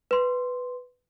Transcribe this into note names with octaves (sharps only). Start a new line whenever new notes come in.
B4 C6